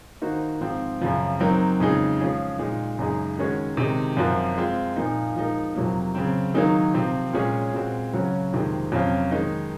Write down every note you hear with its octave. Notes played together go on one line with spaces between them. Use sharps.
D#3 A#3 D#4 F#4 C5
G#2 F3 C4
F#2 C#3 F3
F#3 C4 D#4 A#4
F2 C#3 G#3 D#4 G#4
F3 G#3 C#4 G#4
A#2 G#3 D#4
F#2 C#3 G#3 D#4 G#4
D#3 G#3 C#4 F#4 C#5
C3 D#3 G#3 D#4
F#2 F3 C4 F#4 A#4
G#3 C4 F4
A#2 F3 A#3 D#4
F3 G#3 D#4 A#4
F2 C3 F#3 A#3
C#3 F#3 C4
D#3 F#3 A#3 D#4 G#4
C3 F3 C4
A#2 G#3 C#4 G#4 C#5
A#2 G#3 C4 F#4
C#3 F#3 C#4 F#4 C#5
F2 C3 D#3 G#3 C4
F2 C3 F#3 C#4 F4
D#3 G#3 D#4